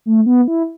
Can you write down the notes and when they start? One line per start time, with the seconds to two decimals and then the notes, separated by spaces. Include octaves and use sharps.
0.06 A3
0.26 B3
0.48 E4